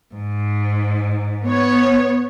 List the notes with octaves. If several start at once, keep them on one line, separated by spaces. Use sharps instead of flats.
G#2
B3 C#5